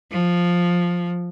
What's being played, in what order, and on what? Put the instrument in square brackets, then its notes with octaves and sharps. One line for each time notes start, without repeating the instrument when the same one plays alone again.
[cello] F3